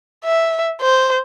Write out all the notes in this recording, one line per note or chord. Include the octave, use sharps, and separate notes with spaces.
E5
C5